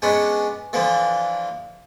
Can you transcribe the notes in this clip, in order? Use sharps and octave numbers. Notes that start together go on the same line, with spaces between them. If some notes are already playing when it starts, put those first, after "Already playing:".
G#3 B3 C#4 D4
D3 E3 F3